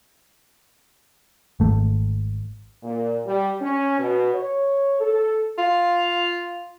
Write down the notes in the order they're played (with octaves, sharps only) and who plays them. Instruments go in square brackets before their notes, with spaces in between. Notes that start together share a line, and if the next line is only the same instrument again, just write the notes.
[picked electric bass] G#1 A3
[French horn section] A#2
G3
C#4
B2
C#5
A4
[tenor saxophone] F4